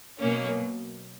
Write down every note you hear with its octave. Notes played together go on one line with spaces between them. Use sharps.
B2 F#3 A#3 C#4